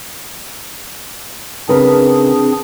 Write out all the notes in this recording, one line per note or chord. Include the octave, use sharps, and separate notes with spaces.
C#3 C4 D4 G#4 A#4 B4